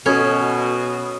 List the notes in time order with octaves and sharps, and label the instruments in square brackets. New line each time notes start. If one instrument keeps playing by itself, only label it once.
[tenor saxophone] B2 [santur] F#3 D#5 B5 [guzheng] C#4 [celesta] A4 C#5 G#6